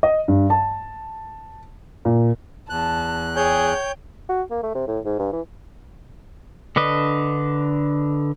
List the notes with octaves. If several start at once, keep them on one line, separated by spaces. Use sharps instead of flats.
D#5
G2
A5
A#2
E2 A5 F#6
G#4 C#5 G5 G6
F#4
A#3
A3
C3
A2
G#2
G2
E3
D3 D4 B4 D#5